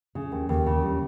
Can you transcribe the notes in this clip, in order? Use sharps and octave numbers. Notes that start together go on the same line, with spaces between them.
C#3
D#2
D#2
C#3
G3